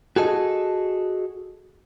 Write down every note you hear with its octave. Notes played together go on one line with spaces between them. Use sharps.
F#4 G#4 A4 D#5